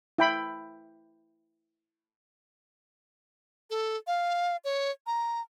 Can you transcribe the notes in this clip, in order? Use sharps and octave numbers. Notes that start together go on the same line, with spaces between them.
E4 G5 B5
A4
F5
C#5
A#5